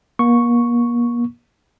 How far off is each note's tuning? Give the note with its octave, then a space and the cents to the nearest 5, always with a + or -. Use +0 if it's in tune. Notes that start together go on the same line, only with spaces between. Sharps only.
A#3 +40 C#6 +0